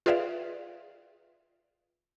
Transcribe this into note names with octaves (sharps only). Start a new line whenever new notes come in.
F4 G#4 B4 D5 E5 F5